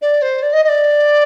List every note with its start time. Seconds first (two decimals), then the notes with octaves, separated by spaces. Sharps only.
0.01 D5
0.22 C5
0.42 D5
0.53 D#5
0.64 D#5
0.68 D5